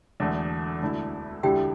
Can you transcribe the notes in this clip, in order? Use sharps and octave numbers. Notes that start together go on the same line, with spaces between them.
E1 E2 D3 A3
E1 D2 D3 A3 E4
E1 D2 D3 A3 E4 G4 G5